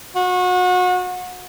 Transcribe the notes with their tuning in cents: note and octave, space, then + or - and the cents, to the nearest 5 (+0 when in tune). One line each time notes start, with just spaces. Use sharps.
F#4 -30